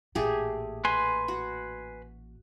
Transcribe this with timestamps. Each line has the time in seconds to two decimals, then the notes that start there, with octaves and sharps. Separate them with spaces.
0.15 A1 A#2 A3 G4 G#4
0.85 B4 G#5 C6
1.28 F#4